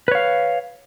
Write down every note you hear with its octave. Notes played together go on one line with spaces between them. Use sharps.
B4 C#5 F5